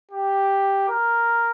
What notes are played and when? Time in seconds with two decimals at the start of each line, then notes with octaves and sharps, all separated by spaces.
0.12 G4
0.89 A#4